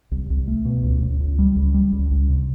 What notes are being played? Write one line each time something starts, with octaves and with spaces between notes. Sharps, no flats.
C2
C2
A3
B2
C#2
C#2
C#2
G3
C#2
G3
C#2
C#2
C3